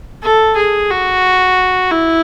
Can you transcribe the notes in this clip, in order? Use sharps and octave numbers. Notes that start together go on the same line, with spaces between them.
A4
G#4
F#4
E4